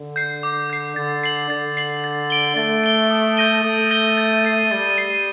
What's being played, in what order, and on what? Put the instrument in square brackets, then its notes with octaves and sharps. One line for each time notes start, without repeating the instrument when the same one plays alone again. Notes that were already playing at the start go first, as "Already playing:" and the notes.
Already playing: [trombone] D3
[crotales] G6 C7
D6
G6 C7
[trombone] D3 [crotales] A6
[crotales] C7 F#7
[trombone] D3 [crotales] A6
[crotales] C7 F#7
A6
D7 G7
[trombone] A3 [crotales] A6
[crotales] D7 G7
D#6
G6 A#6 D#7 G7
[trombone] A3 [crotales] D#6
[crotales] G6 A#6 D#7 G7
A6
C7 D#7
[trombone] G3 [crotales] A6
[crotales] C7 D#7